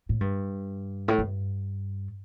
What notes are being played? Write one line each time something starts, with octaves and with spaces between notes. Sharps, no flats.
A2
G2
A2
G2